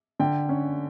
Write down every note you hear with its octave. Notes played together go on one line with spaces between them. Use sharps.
D3 G5
C#4